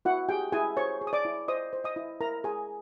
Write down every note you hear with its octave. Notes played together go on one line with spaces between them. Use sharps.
E4 F#4 F#5
G4 G#4 G5
E4 G#4 G#5
C5 C#5 C#6
G#4
D#6
D5 D6
E4
C5 D#5 D#6
C5
D#5 D#6
E4
E4 A#4 A#5
G#4 G#5